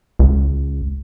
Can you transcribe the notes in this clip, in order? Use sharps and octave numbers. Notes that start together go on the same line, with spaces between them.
C#2